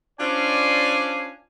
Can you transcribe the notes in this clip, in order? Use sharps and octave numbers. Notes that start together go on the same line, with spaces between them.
C#4 D4 F4 C5 D5 G#5